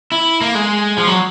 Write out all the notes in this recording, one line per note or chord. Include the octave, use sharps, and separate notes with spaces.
E4
A#3
G#3
F3
F#3